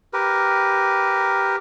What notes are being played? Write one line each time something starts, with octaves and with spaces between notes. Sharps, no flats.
G4 A#4 B4